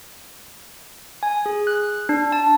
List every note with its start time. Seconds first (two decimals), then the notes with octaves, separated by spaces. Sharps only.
1.23 G#5
1.46 G#4
1.67 F#6
2.09 D4
2.32 A5